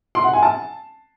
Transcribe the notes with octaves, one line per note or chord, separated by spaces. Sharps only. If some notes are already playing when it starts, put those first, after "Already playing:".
C6
F#5
G#5
A5